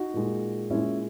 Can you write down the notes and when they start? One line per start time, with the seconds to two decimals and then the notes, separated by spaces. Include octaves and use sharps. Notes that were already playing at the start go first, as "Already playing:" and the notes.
Already playing: D#4 F#4
0.14 A#2 G#3
0.70 A#2 G#3 C#4 E4